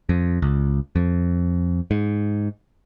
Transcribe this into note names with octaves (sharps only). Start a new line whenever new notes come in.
F2
C#2
F2
G#2